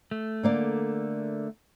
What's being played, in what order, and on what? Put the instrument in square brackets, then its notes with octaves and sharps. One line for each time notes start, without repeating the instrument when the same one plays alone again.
[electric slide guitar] A3
[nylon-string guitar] D3 A#3 D5